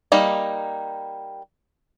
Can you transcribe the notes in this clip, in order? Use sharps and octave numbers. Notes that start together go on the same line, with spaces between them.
G3 A#3 D#4